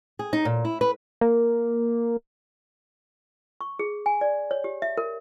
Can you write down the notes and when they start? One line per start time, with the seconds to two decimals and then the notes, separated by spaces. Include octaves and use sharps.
0.19 G#4
0.33 D#4
0.45 A#2
0.65 E4
0.81 B4
1.21 A#3
3.61 C#6
3.79 G#4
4.06 G#5
4.21 D5
4.51 C#5
4.64 G4
4.82 E5
4.97 A#4